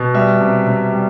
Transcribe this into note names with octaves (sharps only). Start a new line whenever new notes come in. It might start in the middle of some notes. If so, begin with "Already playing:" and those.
Already playing: B2
G3 E5
C3
C3
G3